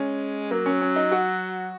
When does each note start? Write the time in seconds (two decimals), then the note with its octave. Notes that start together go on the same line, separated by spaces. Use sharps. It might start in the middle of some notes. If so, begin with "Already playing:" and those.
Already playing: G#3 C#4
0.51 F#3 A#3
0.66 C#4
0.81 C#4
0.96 D#4
1.12 F#4